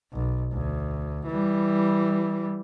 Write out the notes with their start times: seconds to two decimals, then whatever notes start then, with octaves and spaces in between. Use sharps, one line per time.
0.13 B1
0.53 D2
1.27 E3 G3